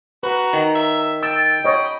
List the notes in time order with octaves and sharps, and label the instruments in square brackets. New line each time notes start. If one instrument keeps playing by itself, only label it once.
[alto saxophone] F#4 [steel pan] B4 [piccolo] A#5
[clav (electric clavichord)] D#3
[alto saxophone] E5
[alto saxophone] G5 [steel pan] E6 [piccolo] A6
[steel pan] C#5 D#5 [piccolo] B5